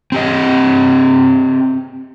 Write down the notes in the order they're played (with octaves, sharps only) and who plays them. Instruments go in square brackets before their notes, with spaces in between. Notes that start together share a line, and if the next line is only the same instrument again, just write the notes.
[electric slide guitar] C4 G4 D#5